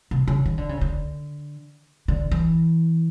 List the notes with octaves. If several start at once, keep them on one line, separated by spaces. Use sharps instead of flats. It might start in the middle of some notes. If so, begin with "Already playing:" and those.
C3
C#3
D#3
D3
C#3
D3
D3
E3